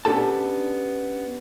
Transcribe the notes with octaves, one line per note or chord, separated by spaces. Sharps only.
B3 C#4 D4 G4 A4 A5